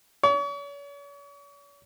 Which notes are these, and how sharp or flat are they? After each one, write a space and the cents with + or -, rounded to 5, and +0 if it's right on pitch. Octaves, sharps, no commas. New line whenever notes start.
C#5 +40